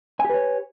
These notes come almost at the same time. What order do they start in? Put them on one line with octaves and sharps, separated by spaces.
G#5 G4 B4 C#5